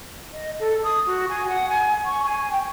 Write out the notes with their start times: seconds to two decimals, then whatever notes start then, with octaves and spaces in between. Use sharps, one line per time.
0.33 D#5
0.59 A4
0.83 D#6
1.06 F#4
1.29 G#5
1.48 F#5
1.69 G#5
2.06 C#6
2.24 G#5
2.51 G5